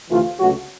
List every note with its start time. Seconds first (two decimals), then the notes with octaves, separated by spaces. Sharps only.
0.10 D2 C3 E3 A3 F4
0.39 C#2 C#3 F#3 A3 F#4